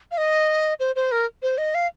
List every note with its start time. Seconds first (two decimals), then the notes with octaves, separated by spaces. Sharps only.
0.11 F5
0.18 D#5
0.80 C5
0.96 C5
1.12 A#4
1.43 C5
1.58 D#5
1.75 F5